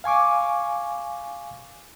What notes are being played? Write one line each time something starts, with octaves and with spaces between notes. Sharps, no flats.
F5 G#5 C#6 D6